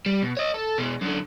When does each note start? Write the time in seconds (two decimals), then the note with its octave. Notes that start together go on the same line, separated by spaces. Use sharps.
0.06 G3
0.22 B2
0.37 C#5 D#5
0.54 A4
0.78 B2 G#3
1.01 F#2 D3